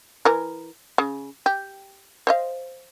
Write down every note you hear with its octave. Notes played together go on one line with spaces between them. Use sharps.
E3 A#4
C#3
G4
C5 D#5 F5